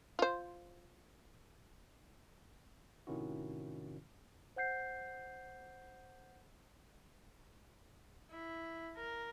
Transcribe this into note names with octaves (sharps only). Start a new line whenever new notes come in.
F4 C5
A2 C3 D#3 C#4 E4 F#4
C5 F#5 G6 C7
E4
A#4